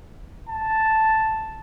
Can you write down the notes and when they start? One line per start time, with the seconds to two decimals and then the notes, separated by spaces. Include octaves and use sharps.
0.50 A5